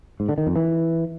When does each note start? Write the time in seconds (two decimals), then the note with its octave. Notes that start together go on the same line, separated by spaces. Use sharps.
0.20 G#2
0.29 D3
0.38 D#3
0.47 F2
0.56 E3